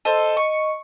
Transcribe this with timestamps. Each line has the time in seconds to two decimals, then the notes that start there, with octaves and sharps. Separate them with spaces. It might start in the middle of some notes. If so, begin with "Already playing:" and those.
0.05 A4 C5 D#5
0.37 C#6